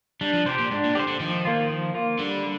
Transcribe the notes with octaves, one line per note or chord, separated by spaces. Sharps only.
G3 D4
F3
C3 G4 C5
A#2
G#2 D4
A#2
D3 G4 C5
D3
D#3 F3
A#3 F4
F3
A#3 F4
D3 G3